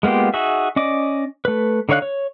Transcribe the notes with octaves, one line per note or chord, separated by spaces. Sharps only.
G#3 A#3 B3 F4 G4
D#4 F#4 G#4 E5
C#4 D5 D#5 D6
A3 B4
D3 D#4 C#5 F5 F#6
C#5